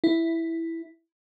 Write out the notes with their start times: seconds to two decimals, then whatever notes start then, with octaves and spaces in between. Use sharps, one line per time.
0.04 E4